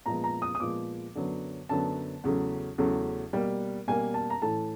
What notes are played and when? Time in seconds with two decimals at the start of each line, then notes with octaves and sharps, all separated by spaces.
0.06 A#2 F3 G#3 B3 A#5
0.24 A#5
0.42 D#6
0.55 D#6
0.60 A#2 F3 G#3 B3 D6
1.15 F#2 D3 F#3 B3
1.69 F#2 D3 F#3 B3 A5
2.24 E2 C#3 F#3 A3
2.78 E2 C#3 F#3 A3
3.33 B2 G3 A#3
3.87 B2 G3 A#3 G#5
4.14 A5
4.30 A#5
4.42 A2 E3 A3 A5